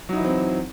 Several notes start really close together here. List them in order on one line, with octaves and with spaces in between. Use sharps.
F#3 D#4 E4 E3 C4